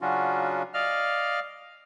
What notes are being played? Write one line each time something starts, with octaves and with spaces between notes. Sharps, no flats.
C#3 F#3 C#4 D4 F4 F#4
D5 D#5 F5 F6